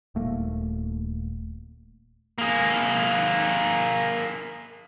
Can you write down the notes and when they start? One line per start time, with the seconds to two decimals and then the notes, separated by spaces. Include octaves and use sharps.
0.15 D#1 A3 A#3
2.38 A#3 G#4